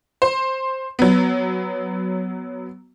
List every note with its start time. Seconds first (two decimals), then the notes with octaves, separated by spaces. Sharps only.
0.22 C5
0.99 F#3 B3